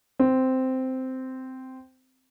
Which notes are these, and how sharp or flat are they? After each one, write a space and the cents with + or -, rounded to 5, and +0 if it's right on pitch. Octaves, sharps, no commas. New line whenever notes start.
C4 -10